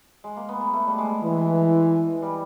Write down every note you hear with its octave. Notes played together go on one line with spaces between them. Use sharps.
G#3
A#3
B3
B3
A3
G3
G#3
E3
G3